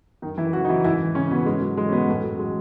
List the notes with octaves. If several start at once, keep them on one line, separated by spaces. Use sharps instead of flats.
F#2 D#3 D#4
E3 E4
C#3 E3 F#3 F#4
D#4
E3 E4
G#2 E3 E4
C#3 E3 C#4
B2 B3
G#2 G#3
F#3
E3 G#3
C#4
B2 B3
F#2 A2 A3
F#3
E3 G#3